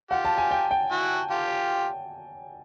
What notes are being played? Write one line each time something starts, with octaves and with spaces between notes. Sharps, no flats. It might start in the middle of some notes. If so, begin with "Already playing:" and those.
F4 G4 F#5
A5
G#5
G5
G5
E4 F#4
F4 G4